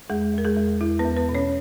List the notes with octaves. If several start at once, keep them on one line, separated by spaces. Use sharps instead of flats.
E2 G#3 G#4
E2 A#4
G#3 G#4
E2
E2 E4
B3 B4
E2
B3 B4
B2
C#4 C#5